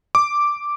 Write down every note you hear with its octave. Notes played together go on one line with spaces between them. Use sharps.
D6